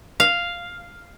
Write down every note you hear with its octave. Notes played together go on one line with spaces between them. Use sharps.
F5